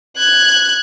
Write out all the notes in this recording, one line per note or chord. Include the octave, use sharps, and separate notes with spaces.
F#6 G#6